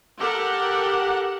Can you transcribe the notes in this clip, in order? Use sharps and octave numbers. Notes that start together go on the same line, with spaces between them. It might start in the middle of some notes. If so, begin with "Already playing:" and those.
G4 A4 A#4 F#5